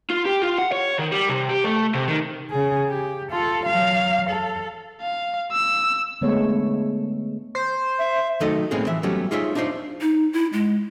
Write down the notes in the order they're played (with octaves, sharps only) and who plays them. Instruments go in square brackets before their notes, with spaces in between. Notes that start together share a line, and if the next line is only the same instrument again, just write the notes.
[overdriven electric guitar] F4
G4
F4
F#5
C#5
D#3
G3
C3
G4
A3
C3
D#3
[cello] C#3 G#4
G4
F4 A4
F#3 F5
A4
[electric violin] F5
E6
[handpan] D3 G#3 A3 B3 C#5
[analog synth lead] C5
[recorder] E5
[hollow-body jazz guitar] D#3 F#3 A3 D#4 A4 D#5
A2 G#3 A#3 C4 C#4 G#4
E3 F3 E5
F#3 G3 A3 B3 C#4 G4
D#4 F4 G#4 C5 C#5 E5
D4 D#4 F4 A#4 C5 C#5
[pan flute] D#4
E4
G#3